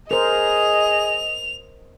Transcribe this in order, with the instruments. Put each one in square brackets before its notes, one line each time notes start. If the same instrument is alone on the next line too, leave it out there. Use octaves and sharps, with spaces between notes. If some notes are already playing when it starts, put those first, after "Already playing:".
[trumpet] G#4 [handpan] A#4 C5 [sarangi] D#5 [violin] F7